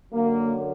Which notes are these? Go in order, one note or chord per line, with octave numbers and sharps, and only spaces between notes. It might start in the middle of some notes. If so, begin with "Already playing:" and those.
F#2 D3 F#3 A#3